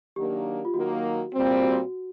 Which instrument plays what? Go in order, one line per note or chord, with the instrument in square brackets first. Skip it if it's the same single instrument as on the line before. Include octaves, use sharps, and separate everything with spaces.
[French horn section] D#3 F#3 A#3 D4 [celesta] G4
[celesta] F4
[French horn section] D#3 F#3 A#3 [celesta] F#4
[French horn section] A#2 G3 C4
[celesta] F#4